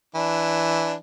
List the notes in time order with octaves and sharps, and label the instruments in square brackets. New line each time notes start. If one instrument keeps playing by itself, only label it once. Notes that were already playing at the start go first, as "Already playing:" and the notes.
[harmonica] E3 D4